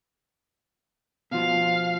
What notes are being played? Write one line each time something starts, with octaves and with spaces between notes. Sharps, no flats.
B2 F3 F5